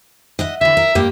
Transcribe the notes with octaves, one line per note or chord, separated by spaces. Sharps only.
D#5 E5 F#5
D3 E3 E5
A#4
G2 A#3 G4